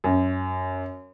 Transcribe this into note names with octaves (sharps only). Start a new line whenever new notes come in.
F#2